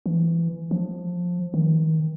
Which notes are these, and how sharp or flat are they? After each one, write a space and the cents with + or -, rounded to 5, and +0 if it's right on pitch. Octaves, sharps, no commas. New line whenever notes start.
E3 +20
F3 +15
D#3 +35